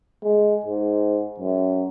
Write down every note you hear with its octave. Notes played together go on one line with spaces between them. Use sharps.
G#3
G#2
F#2